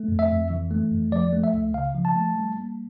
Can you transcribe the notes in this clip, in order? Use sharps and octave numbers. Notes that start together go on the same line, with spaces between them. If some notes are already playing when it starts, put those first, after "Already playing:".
Already playing: A3
F2
E5
F2
E3
A3
F2
F3 D5
A3
E5
C#2
C#3 F5
F3
A5
A3
G3
A#3